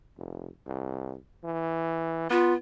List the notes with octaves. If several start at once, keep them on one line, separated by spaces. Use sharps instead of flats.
F1
C2
E3
B3 F4